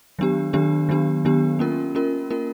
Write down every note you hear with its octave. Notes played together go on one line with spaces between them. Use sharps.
D#3 F#3 B3 D4 G4
D#3 F#3 B3 D4 G4
D#3 F#3 B3 D4 G4
D#3 F#3 B3 D4 G4
A#3 C#4 F4 A#4
A#3 C#4 F4 A#4
A#3 C#4 F4 A#4